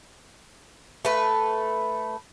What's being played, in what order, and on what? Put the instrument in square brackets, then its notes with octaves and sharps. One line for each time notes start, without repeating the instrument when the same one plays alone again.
[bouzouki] A3 B4